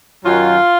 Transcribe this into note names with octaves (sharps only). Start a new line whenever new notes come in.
F#2 D#3 F#3 F4